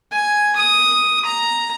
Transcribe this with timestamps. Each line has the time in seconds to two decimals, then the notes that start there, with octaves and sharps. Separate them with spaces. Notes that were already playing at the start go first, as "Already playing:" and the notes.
0.11 G#5
0.56 D#6
1.25 A#5